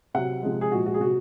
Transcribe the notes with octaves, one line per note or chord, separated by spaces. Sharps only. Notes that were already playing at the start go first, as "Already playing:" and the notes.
C3 F#3 F#5
C3 F3 G#3
G#4
A#2 F3 G#3 F#4
F#4
G#4
C3 F#3 F#4